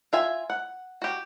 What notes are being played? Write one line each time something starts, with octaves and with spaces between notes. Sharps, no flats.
F4 E5 G#5
F#5
F#4 G4